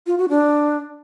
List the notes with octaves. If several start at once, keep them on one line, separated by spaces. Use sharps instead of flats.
F4
F#4
D4